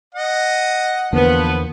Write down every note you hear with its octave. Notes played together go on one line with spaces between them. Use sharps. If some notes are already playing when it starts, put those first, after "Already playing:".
D#5 F#5
E2 D3 F3 A#3 B3